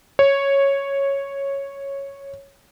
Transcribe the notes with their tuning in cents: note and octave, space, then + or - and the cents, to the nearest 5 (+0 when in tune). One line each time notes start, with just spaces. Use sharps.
C#5 -5